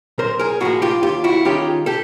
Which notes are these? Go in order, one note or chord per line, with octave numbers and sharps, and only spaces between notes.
B1 A#4 C5
G#4 A#4
A2 F3 A#3 F#4 G#4
F4 G4
D#2 F4 G4
E4 F#4
D#3 G#3 C#4 F4 G4
G4 A4